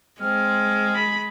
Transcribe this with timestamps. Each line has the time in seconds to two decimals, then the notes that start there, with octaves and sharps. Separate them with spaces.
0.20 G#3 C4 F6
0.95 B5